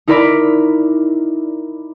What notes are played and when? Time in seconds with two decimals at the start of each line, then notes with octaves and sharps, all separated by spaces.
0.08 D#4 E4 A#4 D5 B5